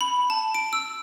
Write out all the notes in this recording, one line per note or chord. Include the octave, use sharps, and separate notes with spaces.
B5
A5
D7
E6